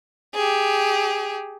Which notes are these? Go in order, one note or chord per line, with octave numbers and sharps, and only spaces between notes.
G4 G#4